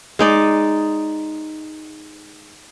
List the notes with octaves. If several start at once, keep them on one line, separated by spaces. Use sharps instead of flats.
G#3 D#4 D5